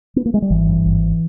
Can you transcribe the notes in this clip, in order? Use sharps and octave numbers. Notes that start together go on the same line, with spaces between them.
B3
A#3
G#3
G3
G#1 E3
G2
G#1